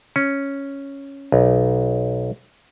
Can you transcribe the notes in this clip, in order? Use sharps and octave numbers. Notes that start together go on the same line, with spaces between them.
C#4
B1